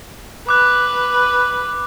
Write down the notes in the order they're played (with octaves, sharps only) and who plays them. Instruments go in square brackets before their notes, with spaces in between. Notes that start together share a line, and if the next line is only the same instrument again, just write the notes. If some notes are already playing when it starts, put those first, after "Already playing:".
[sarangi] B4 [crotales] D6 F#6